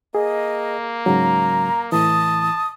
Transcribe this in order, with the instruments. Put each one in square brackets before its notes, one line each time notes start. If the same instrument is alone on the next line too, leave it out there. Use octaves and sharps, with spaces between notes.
[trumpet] A#3 [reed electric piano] G#4 [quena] D#5
[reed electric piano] G#2 C#3 F#3 [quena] A#5
[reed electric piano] A2 E3 [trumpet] A5 [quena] D#6